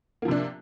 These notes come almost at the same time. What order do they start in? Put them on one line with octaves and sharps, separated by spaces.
A#3 F3 C3 D4